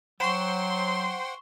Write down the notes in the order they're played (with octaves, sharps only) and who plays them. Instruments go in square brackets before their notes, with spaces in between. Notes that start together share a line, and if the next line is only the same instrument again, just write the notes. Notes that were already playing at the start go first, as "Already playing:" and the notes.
[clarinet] F#3 [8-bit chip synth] C5 F#5 G5 [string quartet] C6 [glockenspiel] C#6 E7